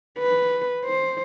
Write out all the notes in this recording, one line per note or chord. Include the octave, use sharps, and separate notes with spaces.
B4
C5